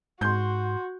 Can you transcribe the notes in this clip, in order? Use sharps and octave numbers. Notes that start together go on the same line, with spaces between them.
G#2 F#4 C6 G6